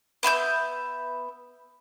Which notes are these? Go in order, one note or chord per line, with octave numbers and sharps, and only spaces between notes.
B3 E5 B5 G6